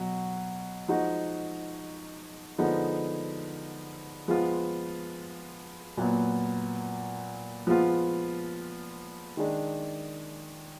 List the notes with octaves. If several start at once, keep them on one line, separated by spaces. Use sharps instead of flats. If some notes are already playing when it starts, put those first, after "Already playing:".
Already playing: B2 F#3
F3 G#3 D#4 F#4
D3 F3 G#3 B3 D#4
F3 G#3 B3 F4
A#2 F#3 B3
F3 G#3 B3 F4
D#3 G#3 D4